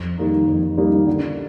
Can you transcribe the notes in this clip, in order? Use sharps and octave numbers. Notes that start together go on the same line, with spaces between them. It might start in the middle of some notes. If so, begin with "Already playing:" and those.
Already playing: F2
D#3 G3 A#3 D#4
F2
D#3 G3 A#3 D#4
D3